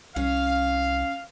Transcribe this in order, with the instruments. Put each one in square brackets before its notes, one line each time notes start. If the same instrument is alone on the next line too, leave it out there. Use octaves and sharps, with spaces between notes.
[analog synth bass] C2 [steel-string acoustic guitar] C#4 [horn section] F5